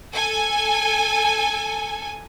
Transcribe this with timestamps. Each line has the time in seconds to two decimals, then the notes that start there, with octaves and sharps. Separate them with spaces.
0.13 A4 G#5